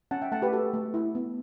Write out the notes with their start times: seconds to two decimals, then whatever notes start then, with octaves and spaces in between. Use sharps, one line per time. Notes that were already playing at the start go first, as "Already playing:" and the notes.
0.11 C#4 F#5 A5
0.22 E5 G5
0.32 A3 F#5 A5
0.42 G4 B4
0.53 F#4 A4
0.73 A3
0.94 E4
1.15 B3